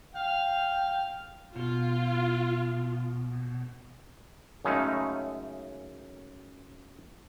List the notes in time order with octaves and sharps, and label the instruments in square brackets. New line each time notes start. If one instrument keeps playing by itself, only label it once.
[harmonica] F5 G5
[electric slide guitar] B2 [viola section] F4
[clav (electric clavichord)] F#2 C#3 G#3 A3 C#4 D#4